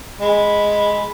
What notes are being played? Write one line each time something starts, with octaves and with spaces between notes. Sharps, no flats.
G#3 B5